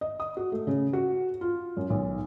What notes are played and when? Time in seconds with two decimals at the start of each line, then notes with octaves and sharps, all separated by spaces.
0.01 D#5
0.20 D#6
0.37 F#4
0.52 A3
0.67 C#3
0.93 F#4
1.41 F4
1.77 F#2
1.90 B1